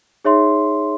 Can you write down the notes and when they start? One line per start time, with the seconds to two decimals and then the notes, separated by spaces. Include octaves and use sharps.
0.25 D#4 G#4 C#5 E5 C6